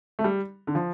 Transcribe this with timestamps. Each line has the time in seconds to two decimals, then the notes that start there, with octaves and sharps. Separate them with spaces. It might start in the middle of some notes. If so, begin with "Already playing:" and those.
0.19 A3
0.24 G3
0.67 D3
0.75 F3